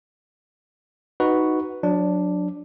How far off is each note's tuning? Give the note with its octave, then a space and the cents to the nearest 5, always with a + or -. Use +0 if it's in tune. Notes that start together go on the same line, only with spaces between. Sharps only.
D#4 +0 F#4 +0 B4 +0
F#3 -30 D4 +0